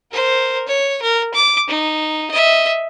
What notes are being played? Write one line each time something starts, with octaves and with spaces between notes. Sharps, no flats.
A#4 C5
C#5
A#4
D6
D#4
D#5 E5